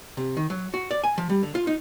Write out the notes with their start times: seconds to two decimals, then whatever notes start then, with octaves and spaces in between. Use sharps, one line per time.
0.17 C3
0.37 D#3
0.50 F#3
0.74 F#4
0.91 D5
1.04 G#5
1.18 F3
1.30 G3
1.43 D3
1.55 F4
1.67 D#4